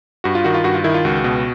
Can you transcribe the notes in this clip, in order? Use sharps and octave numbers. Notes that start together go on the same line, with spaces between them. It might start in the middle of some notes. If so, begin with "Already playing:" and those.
G2 F#4
F4
D#3 F#4
F4
G2 F#4
F4
D#3 E4
F4
C#2 F#4
B2